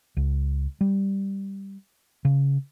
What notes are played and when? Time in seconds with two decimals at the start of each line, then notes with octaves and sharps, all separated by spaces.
0.17 C#2
0.81 G3
2.25 C#3